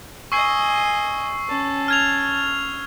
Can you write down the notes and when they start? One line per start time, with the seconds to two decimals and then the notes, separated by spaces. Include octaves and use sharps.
0.32 D#5 G#5 C#6 E6 C7
1.49 C#4 A5
1.88 F6 G#6 F7